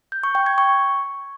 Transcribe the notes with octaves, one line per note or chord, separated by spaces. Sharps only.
G6
C#6
G5
G#6
C#6